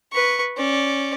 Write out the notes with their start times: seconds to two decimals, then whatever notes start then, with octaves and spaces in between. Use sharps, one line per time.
0.13 B4 C#6
0.57 C#4 D5